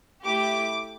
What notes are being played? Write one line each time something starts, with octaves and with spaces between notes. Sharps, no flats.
A3 E4 G4 D6